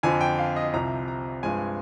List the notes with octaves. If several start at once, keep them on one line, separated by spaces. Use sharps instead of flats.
F2 D3 F3 C4 G#5
G5
F5
D#5
C2 C3 F3 A#5
A#5
G2 F3 G#3 C4 G#5